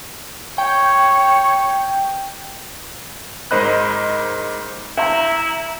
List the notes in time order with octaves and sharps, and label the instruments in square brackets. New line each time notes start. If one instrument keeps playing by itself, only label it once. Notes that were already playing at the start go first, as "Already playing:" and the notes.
[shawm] C#5 [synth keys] G5
[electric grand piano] G#2 A#4 C5 D#5 B5 F#6
[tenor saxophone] E4 [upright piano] E5 [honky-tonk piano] A#5 G6